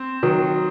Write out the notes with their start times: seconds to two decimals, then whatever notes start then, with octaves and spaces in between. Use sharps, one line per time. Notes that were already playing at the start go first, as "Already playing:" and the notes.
Already playing: C4
0.23 D#3 F#3